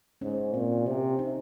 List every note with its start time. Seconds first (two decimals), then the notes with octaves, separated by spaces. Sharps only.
0.21 G#2 C#4
0.54 A#2 C4
0.86 C3 C#4
1.19 D#4